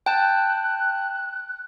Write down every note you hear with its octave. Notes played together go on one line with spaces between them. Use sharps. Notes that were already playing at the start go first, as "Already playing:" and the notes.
G5 A5 F#6